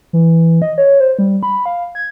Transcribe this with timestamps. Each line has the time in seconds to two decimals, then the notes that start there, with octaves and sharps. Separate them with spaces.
0.13 E3
0.62 D#5
0.78 C#5
1.00 C5
1.19 G3
1.43 B5
1.66 F5
1.95 G#6